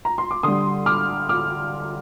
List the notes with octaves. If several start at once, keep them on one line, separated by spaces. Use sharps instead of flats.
A#5
C6
D6
D3 G3 C6 D#6
D6 F6
D6 F6